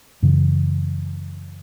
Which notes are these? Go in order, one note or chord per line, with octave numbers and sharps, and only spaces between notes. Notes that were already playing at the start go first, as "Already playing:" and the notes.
F#2 C#3 E3